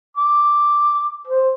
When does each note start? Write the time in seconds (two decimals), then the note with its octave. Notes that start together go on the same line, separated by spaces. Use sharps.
0.17 D6
1.27 C5